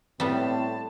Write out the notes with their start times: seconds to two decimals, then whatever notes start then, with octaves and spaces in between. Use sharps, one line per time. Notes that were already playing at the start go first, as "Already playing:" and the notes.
0.20 A2 G3 B3 C4 A5